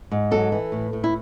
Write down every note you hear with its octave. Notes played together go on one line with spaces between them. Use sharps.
G#2
F#3 A4
E3
A2
A2
E4